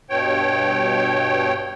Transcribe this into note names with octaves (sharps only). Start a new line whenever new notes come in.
G2 B2 C#5 G5